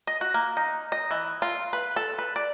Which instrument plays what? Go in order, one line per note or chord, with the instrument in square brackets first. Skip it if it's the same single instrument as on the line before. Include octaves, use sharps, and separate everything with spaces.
[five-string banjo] D#5
F#4
A#3
D#4
D#5
E3
F4
B4
A4
B4
D5